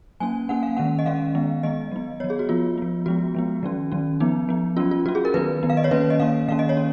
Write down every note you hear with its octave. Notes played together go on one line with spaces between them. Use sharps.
F#3 A#3 C#4 G#5
F#3 A#3 C#4 F#5
F5
D#3 G#3 C#4 F#5
D#5
D#3 G#3 C#4 F5
D#3 G#3 B3
D#3 G#3 B3 D#5
F#3 B3
F#3 B3 C#5
G#4
F#4
F3 B3 F4
F3 B3
F3 G#3 B3 F#4
F3 G#3 B3
D#3 F#3 C#4
D#3 F#3 C#4
F3 B3 D#4
F3 B3
F#3 C#4 F4
F4
F#3 C#4 F#4
G#4
A#4
D#3 F#3 B3 B4
D#3 F#3 B3
F5
D#5
C#5
D#3 A#3 C#4 B4
D#5
D#3 A#3 C#4 F5
D#3 A#3 C#4 F5
D#5
C#5
C#4